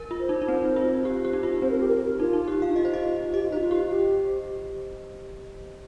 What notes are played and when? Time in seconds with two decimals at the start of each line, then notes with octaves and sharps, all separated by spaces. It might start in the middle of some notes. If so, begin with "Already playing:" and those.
Already playing: A#4
0.11 F4
0.20 C5
0.29 D#4
0.42 D#4
0.48 C4
0.76 F4
1.05 G4
1.25 G4
1.33 D#4
1.43 F4
1.62 C4 C5
1.71 A#4
1.80 G4
1.88 A#4
2.20 D#4 F4
2.33 D#4
2.48 G4
2.62 F5
2.70 D#4
2.76 F4 D#5
2.85 C5
2.94 D#5
3.33 G4 D#5
3.42 F4
3.52 D#4 C5
3.60 F4
3.71 G4
3.90 G4